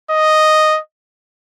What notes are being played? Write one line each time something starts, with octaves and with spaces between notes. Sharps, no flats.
D#5